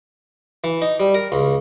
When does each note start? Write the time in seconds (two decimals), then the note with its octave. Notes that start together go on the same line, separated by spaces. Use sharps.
0.64 E3
0.82 D#4
1.00 G3
1.15 A#4
1.32 C#2